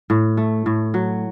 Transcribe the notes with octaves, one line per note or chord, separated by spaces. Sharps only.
A2
A3
A2
F#3